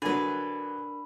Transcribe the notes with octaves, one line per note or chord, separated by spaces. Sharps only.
D3 F#3 D4 A#4 B4 G#5 B5